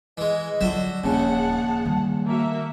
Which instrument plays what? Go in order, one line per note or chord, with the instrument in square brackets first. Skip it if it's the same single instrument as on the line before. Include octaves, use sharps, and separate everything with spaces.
[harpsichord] E3 G#3 [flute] D#5
[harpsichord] D3 F#4 E5 [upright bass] F#3 F4
[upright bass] D#1 C#4 [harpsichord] A#1 C#3 [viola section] G#4 F#5 [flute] A5
[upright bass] D#3 G3
[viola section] A#3 F#4 E5